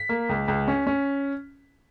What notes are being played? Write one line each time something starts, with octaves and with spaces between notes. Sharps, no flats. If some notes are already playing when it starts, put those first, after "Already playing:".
Already playing: B6
A#3
C#2
C#2
C#4
C#4